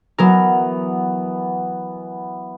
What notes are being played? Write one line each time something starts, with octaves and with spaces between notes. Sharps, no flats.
E3 F#3 B3 A#4